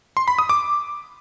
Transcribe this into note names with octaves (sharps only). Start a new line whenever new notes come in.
C6
B5
D#6
D6